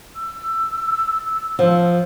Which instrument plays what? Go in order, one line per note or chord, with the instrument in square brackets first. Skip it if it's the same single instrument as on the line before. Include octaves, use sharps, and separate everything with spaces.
[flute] E6
[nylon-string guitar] F3